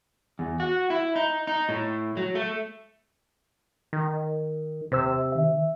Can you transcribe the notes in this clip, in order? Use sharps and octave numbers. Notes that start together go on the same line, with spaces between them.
E2
F#4
E4
D#4
D#4
A2
F#3
A3
D#3
D#2 C3 C5 E6
D#3 E5